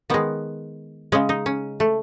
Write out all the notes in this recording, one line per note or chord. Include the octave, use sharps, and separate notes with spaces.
D#3 G#3 B3
C#3 G#3 C#4
D#4
C#4
A3